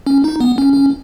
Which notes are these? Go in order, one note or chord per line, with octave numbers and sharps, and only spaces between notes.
C#4
D#4
B3
C#4
C#4